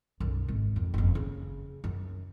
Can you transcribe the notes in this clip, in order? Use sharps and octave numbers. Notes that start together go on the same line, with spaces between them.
B1 F#2
G#1 G#3
F2
F#1 F2
C#3
F#2